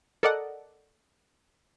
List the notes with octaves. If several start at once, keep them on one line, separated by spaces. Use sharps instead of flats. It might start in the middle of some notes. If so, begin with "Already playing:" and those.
A4 A#4 D5 D#5 F#5